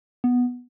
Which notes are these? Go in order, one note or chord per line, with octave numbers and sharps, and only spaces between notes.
B3